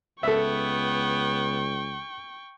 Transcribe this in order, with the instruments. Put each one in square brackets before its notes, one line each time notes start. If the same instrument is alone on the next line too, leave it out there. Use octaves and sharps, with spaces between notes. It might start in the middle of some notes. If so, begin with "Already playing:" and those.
[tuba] C#2 [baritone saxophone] B3 [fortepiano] A4 E5 [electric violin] G5 C#6